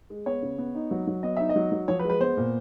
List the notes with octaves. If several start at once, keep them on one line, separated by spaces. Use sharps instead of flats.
G#3
B3 C#5
C#3
B3
D#4
F#3
F#3
B3 D#5
D#4 E5
D#5
F#3
F#3
F3 C#5
B4
G#3
B4
B3 C5
A#2